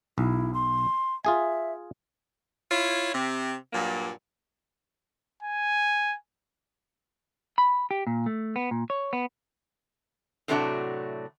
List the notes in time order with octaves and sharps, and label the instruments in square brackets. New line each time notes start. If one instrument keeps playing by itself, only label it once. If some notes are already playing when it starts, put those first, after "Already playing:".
[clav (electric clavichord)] B1 [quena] E4
[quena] C6
[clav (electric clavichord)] F4 G#4 G#5 [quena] E5
[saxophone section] E4 F4 C#5
C3 C4
G2 A#2 F#3 A#3
[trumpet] G#5
[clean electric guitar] B5
G4
A#2
A3
B3
A#2
C#5
B3
[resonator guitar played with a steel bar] A2 C3 F#3 A3 D4 F#4